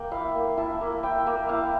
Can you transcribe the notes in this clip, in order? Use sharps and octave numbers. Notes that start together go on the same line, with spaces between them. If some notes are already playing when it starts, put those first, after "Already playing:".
Already playing: A#3 G5
E4 F5
A#3
E4 A5
A#3
E4 G5
A#3
E4 F5